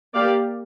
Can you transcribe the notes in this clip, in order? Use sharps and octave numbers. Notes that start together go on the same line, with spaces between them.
A#3 G4 D5 F5